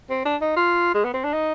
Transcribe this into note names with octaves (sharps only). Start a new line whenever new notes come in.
C4
D4
D#4
F4
G#3
B3
C4
D4
D#4